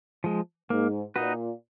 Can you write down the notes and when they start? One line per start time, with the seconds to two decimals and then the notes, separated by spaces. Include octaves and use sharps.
0.24 F3 G#3
0.70 G#2 A#3
1.16 A#2 D#4 F#4 B4